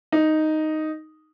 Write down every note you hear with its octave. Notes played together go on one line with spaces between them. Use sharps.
D#4